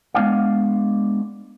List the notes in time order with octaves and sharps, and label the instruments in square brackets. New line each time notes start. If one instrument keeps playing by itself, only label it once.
[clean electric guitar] G#3 B3 C4 D4 D5 F5